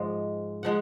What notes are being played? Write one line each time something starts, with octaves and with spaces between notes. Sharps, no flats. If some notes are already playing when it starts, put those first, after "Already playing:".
Already playing: G#2 F3 G#3
F3 G#3 F#5